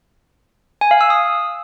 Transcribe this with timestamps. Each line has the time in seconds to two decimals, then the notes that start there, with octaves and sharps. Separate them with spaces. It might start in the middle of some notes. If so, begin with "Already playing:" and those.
0.81 G#5
0.91 F5
1.01 E6
1.10 D#6